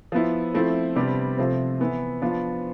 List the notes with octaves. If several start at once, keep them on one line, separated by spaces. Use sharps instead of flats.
F3 B3 E4
F3 A3 C4 E4
C3 G3 B3 D4
C3 F3 A3 C4
E3 B3 E4
F3 B3 D4 F4